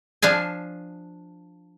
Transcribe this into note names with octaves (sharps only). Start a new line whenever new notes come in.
F3 D4 F5 G#5